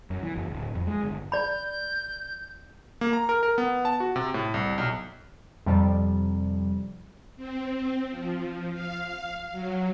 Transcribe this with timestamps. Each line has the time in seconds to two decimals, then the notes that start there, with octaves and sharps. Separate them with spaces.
0.10 F#2
0.23 E3
0.36 F#1
0.50 D1
0.75 F2
0.87 G#3
1.02 G1
1.32 D5 B5 G6
3.01 A#3
3.13 A#5
3.29 A#4
3.43 A#4
3.58 B3
3.85 A5
4.00 F#4
4.16 C3
4.34 A2
4.54 C2
4.78 B1
5.66 F2 C3 F3 G3
7.36 C4
8.10 F3
8.72 F5
9.52 F#3